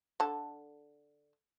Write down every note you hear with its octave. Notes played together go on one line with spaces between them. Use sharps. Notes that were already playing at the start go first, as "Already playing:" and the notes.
D3 A4